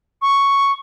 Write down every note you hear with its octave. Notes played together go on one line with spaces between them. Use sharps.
C#6